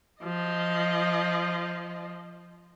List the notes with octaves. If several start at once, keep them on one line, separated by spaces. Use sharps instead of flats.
F3 D#5